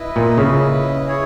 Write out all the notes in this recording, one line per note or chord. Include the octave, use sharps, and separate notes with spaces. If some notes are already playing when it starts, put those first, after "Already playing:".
Already playing: E4 B4 D#5
A#2
C#3
E4 G#4 C#5